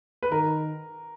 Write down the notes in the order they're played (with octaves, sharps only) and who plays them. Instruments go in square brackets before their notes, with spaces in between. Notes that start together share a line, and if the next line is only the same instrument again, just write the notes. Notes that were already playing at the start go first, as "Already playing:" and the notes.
[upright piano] B4
[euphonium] D#3 [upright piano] A#4